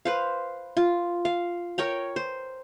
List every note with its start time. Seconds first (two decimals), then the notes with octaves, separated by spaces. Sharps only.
0.05 B4 C5 F5
0.77 F4
1.25 F5
1.78 A#4 C#5 G5 A#5
2.16 C5